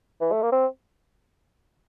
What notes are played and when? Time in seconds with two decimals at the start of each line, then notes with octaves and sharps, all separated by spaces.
0.21 E3
0.32 A3
0.42 A#3
0.52 C4